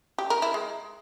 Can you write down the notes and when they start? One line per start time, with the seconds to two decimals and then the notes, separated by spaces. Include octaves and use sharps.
0.18 G4
0.30 A#4
0.42 E4
0.54 G#3